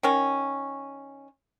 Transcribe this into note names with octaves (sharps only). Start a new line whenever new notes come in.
D#3 C#4